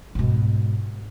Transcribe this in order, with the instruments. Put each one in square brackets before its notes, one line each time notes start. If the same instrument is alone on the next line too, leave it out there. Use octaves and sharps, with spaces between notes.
[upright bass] G#2 B2